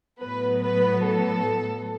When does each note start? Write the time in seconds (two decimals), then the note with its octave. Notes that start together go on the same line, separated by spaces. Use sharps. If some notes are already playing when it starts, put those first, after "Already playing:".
0.21 A2 F#3 B3 B4
0.63 B4
1.04 A4